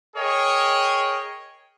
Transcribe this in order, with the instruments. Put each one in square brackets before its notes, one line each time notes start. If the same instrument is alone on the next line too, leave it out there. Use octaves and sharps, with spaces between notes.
[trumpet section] G#4 A#4 C#5 D#5 G5